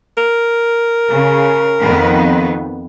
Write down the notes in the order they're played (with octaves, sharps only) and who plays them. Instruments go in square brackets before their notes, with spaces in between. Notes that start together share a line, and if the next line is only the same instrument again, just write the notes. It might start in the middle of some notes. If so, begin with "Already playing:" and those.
[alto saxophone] A#4
[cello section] C#3
F2 D#3 B3